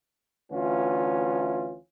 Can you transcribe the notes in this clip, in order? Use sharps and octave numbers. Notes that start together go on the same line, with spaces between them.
D2 E3 C#4 F4